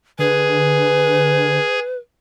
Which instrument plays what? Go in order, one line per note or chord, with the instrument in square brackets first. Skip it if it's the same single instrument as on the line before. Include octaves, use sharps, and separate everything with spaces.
[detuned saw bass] D3 [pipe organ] G#4 [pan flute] B4